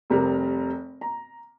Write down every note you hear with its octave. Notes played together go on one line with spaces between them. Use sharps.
F1 C3 G3 A#4
A#5